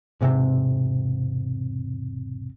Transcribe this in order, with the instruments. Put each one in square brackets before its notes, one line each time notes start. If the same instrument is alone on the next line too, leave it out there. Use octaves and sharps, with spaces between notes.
[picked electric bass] E1 G#2 C3 C4